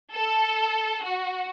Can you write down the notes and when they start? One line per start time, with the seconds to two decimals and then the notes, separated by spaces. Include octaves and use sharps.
0.12 A4
1.03 F#4